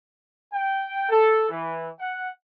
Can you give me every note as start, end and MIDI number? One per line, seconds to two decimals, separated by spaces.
0.53 1.06 79
1.09 1.47 69
1.49 1.89 52
1.99 2.28 78